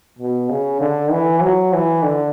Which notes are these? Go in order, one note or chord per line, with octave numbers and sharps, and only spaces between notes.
B2
C#3
D3
E3
F#3
E3
D3